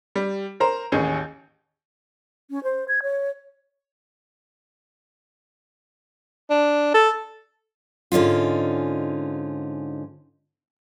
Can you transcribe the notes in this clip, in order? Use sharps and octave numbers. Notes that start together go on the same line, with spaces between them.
G3
A#4 C5 A#5
A1 D#2 C#4 G#4 G6
C#4
C5
G#6
C#5
D4
A4
G#2 D3 C#4 D#4 F4